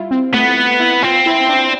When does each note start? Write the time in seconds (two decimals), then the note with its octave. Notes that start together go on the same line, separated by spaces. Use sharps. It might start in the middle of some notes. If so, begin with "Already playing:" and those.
Already playing: G3 E4 F4
0.11 C4
0.34 A3 B3
0.80 E4
1.03 C4 F4
1.26 E4
1.49 D4